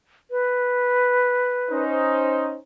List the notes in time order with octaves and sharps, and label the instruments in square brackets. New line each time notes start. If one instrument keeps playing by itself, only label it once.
[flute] B4
[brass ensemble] C#4 D#4 C5